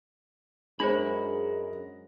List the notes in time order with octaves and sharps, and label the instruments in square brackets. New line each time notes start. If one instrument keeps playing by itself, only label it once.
[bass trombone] F#2 [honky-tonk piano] G#3 [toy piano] D4 C5 [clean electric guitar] F#4 A#4 B5